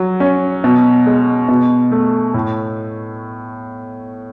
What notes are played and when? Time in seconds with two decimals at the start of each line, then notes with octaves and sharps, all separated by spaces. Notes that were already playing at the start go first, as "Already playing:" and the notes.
Already playing: F#3
0.20 C#4
0.64 B2
1.07 G#3
1.48 B2
1.92 A3
2.34 A2